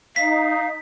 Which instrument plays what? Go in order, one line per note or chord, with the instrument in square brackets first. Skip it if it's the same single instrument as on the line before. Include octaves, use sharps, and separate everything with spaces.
[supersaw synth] D#4 [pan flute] F5 [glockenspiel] B6